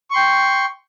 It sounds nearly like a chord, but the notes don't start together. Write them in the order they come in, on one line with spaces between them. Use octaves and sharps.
C#6 C6 G5